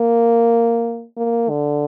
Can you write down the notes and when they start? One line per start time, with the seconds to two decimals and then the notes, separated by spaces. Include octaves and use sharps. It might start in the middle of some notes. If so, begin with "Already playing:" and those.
Already playing: A#3
1.17 A#3
1.50 D3